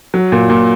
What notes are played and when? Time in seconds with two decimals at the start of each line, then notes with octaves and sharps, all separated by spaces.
0.14 F#3
0.32 A#2
0.50 A#2